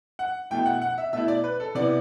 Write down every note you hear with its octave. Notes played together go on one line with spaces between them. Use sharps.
F#5
B2 A3 E4 G5
F#5
F#5
E5
B2 A3 E4 E5
D5
B4
A4
C3 E3 B3 E4 D5